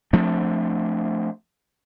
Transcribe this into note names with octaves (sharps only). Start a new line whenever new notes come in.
F3 A3 C4 D4